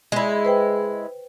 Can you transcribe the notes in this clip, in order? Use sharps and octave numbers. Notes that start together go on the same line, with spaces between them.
G#3 E4
B4 C5 G5